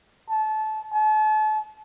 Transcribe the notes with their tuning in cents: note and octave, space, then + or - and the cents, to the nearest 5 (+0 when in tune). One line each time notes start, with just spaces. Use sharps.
A5 -25
A5 -40